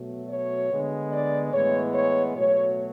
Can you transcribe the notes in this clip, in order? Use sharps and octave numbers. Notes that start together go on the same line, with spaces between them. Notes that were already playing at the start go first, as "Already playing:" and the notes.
Already playing: B2 F#3 A3
C#5
D3 G#3 B3
D5
A2 E3 G#3 B3 C#5
C#5
B2 F#3 A3 C#5